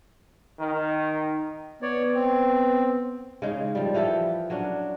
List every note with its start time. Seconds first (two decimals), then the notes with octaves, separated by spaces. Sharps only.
0.60 D#3
1.82 B3 C#5 D5
2.14 C4
3.42 C#3 G#3 D#4
3.75 F3 G3
3.94 E3 F3 G4 A4
4.50 F#3 C#4 D4